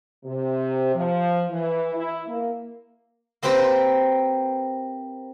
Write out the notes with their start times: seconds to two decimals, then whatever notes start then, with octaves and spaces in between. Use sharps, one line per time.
0.23 C3
0.93 F3
1.48 E3
1.94 E4
2.26 A#3
3.43 A#3 C4 G4 B4 C5